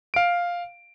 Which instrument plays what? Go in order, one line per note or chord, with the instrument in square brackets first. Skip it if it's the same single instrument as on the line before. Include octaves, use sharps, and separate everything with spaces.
[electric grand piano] F5 D7